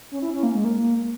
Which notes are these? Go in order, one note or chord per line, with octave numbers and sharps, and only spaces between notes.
C#4
E4
C#4
A#3
G#3
A#3